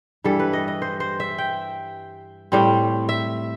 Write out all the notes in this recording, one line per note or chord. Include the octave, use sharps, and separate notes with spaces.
G2 E3 G3 A4
B4
D#5
D#5
C5
C5
E5
G5
A2 G3 C4
E5